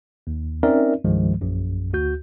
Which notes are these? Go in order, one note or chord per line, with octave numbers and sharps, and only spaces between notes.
D#2
C4 C#4 D#4 A#4 D5 E5
C2 G2 D#3 F3 G#3
A#1 F#2
D2 F#4 G6